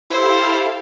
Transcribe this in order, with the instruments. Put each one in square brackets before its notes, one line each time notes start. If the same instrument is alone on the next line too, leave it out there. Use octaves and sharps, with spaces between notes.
[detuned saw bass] E4 [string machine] G4 A4 F5 [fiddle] C5